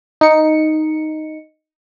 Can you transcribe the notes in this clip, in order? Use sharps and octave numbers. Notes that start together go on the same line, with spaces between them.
D#4 C#7